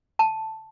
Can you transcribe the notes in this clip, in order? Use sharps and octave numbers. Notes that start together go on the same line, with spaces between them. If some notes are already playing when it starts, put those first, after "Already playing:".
A5